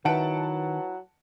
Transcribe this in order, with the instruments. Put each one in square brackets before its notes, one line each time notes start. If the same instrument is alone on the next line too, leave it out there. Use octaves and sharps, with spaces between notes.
[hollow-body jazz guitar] D#3 [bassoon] F#3 [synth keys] E4 B4 [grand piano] F#5 A5 D7